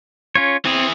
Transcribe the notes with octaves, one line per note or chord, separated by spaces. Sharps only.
C#4 F4 C#5
E3 C4 G#4